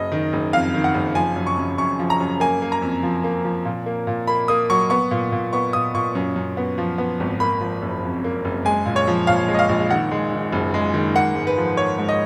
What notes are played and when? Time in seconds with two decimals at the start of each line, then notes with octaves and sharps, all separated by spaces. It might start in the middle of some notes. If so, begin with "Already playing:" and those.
Already playing: F#1 D#5
0.12 D#3
0.33 F#1
0.53 F2 F5
0.74 D#3
0.84 F#5
0.94 F#1
1.15 F3 G#5
1.36 F#2
1.47 C#6
1.58 F#2
1.78 F#2 C#6
1.99 F3
2.10 A#5
2.20 F#2
2.40 A#3 G#5
2.62 A#3
2.72 A#5
2.82 F2
3.03 F3
3.24 A#3
3.45 F3
3.65 A#2
3.86 A#3
4.07 A#2
4.27 A#3 B5
4.48 A#3 D#6
4.70 F#3 C#6
4.90 B3 C#6
5.11 A#2
5.32 A#2
5.53 B3 C#6
5.73 A#2 D#6
5.94 A#2 C#6
6.15 F#2
6.36 F#2
6.57 B3
6.78 F3
6.98 B3
7.20 G#1
7.40 A#3 B5
7.61 F3
7.82 F#1
8.03 F2
8.24 A#3
8.45 F#1
8.65 G#3 G#5
8.86 A#2
8.96 C#5
9.07 F3
9.27 A#1 F5
9.48 G#3
9.54 D#5
9.59 F5
9.69 A#1
9.90 D#3 F#5
10.11 G#3
10.32 D#3
10.52 F#1
10.74 G#3
10.94 D#3
11.15 A#3 F#5
11.35 G#2
11.47 B4
11.57 F3
11.77 A#3 C#5
11.98 G#2
12.09 D#5